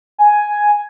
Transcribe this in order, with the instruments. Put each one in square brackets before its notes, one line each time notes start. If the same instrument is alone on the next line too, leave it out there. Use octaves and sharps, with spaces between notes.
[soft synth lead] G#5